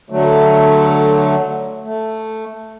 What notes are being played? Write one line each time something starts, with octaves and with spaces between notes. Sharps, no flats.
D3 F#3 A3
A3